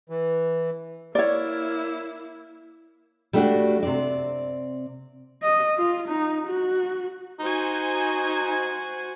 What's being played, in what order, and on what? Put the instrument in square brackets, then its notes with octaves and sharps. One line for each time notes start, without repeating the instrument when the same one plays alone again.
[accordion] E3
[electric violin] A#3 E4 [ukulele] C#5 D5
[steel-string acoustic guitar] G3 A3 B3 D4 F#4
C3 C4 D5
[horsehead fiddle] D#5
F4
D#4
F#4
[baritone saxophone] D#4 [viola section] F#4 C5 G#5